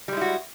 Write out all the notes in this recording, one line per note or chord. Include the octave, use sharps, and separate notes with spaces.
G3 G#3 E4 F#4